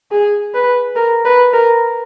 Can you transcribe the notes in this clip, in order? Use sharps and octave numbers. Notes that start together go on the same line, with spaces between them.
G#4
B4
A#4
B4
A#4